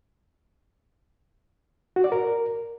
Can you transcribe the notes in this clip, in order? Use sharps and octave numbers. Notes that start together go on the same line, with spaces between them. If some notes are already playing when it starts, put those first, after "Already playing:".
F#4
D5
A#4